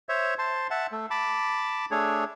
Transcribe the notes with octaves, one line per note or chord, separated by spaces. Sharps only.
C5 C#5 E5
C5 A5 C6
E5 F#5 A5
A3
A5 B5 D6
A3 D4 G#4 C#5